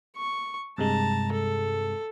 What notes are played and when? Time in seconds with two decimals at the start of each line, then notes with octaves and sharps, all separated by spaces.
0.17 C#6
0.78 G2 C3 G#3 A5 A#5
1.32 A4